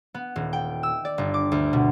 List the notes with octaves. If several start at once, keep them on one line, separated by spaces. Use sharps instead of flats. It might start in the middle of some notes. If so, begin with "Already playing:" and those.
B3
D#1
G5
E6
D5
G1
D6
D2
B2